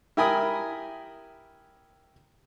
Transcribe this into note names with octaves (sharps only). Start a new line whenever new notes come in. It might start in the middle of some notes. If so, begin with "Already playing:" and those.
E4 G4 A#4 G#5 B5 D#6